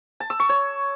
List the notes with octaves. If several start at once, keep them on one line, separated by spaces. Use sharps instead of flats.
A5
E6
C#6
C#5